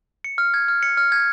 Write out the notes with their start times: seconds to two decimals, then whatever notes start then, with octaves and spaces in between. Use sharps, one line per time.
0.24 C#7
0.38 F6
0.54 G#6
0.68 F6
0.83 C#7
0.97 F6
1.12 G#6